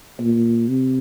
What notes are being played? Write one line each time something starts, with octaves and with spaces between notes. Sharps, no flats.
A#2
C3